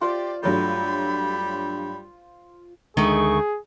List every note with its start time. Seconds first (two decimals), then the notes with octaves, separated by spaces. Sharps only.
0.01 F4 G4 C5 D5
0.43 G2 F#3 G3 A3 B5
2.97 D2 D#3 G#3 A3 D4 G#4 C#6